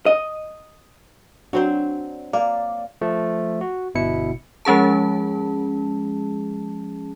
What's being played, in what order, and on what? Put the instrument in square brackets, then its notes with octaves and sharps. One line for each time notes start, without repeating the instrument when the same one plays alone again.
[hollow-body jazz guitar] D#5
[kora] F#3 C4 C5 [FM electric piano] D4
[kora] A#3 [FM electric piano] D5
[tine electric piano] F3 A3
F#4
G1 B2 E4 C#7
[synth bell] F3 G#3 C#4 G#4 A5